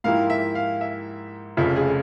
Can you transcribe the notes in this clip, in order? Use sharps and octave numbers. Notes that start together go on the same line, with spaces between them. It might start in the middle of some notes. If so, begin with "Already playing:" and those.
G#2 F3 A#3 E4 G4 F5
E5
F5
E5
F1 F2 C#3 F3 E5
G#4